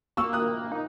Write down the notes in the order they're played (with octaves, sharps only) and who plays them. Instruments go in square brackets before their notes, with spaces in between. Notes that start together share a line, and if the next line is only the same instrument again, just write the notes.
[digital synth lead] A#3 [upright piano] C#6 E6
[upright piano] D#6 F#6
[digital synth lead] D#4